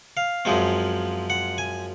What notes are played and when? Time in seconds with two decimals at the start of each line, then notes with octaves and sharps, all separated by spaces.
0.17 F5
0.45 F#2 F3 G#3 C4
1.30 F#5
1.58 G#5